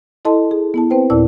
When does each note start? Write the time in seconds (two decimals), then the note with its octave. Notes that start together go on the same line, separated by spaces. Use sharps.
0.25 E4 A4 D#5 A5 C6
0.51 G#4
0.74 B3 E4 A5
0.90 C4 B4 C5 G5
1.10 D#2 A#2 E4 D5 A5 E6